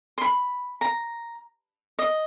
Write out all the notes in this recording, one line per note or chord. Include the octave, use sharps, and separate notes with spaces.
C6
B5
A#5
D#5